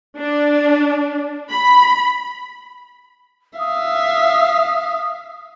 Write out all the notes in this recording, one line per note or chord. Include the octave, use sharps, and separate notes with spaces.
D4
B5
E5 F5 D#6